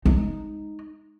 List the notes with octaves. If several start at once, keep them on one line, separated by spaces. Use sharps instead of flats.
G#3 D#4